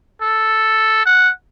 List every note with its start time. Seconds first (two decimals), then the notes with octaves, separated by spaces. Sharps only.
0.22 A4
1.06 F#5